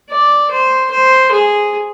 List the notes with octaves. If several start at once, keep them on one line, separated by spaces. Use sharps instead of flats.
D5
C5
C5
G#4